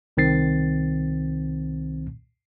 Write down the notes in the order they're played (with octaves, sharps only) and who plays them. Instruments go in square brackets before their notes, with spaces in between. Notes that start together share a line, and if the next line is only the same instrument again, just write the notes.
[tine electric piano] C2 D#3 C4 A6 C7